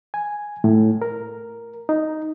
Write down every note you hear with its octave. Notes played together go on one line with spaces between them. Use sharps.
G#5
A2
A#4
D#4